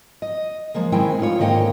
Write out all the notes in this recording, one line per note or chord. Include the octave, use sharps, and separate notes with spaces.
D#5
F3 G#3 A#3
D#3 G#3 C4 E4 G5 G#5
A2 D#4 F4 C#5
G#2 D3 D#3 A#3 D#5 G5